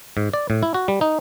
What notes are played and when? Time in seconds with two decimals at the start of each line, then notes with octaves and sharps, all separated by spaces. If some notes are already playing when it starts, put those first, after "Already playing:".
0.17 G#2
0.33 D5
0.50 A2
0.63 E4
0.74 F#4
0.88 G3
1.01 D#4